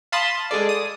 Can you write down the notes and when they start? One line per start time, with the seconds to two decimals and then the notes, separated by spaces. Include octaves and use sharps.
0.12 F5 A5 B5 C6 D#6
0.51 G#3 G#4 A4 D5
0.69 D#6